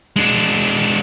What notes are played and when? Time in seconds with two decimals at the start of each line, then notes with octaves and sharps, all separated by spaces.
0.16 G#3 D4